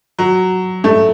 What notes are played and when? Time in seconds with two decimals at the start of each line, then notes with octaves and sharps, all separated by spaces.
0.19 F#3
0.84 A3